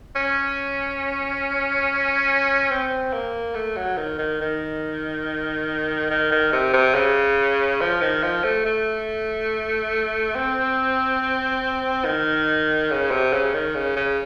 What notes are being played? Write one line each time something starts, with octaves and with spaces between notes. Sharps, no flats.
C#4
C4
A#3
A3
F#3
D#3
D#3
D#3
D#3
D#3
C3
C3
C#3
F3
D#3
F3
A3
A3
C4
D#3
C#3
C3
C#3
D#3
C#3
C#3